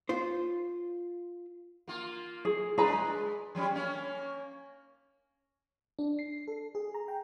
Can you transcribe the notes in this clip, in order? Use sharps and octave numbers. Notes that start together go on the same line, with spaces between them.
F4 C5
A#3 F4
G#4
G#3 D4 G#4 B4 A#5
F3 G3 C#4
A#3 C#4
D4
C7
A4
G#4
A#5
G5